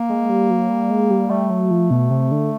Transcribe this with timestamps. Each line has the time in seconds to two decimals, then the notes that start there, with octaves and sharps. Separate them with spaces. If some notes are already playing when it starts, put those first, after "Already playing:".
Already playing: A#3
0.10 G#3
0.30 G3
0.50 F#3
0.70 G3
0.91 G#3
1.10 G3
1.30 G3 A3
1.50 F#3
1.71 F3
1.90 B2
2.10 C3
2.31 D3